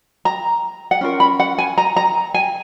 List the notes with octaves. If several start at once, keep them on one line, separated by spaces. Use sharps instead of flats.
A#5
F#5
C#4 F4 A#4
B5
F#5
G#5
A#5
A#5
G#5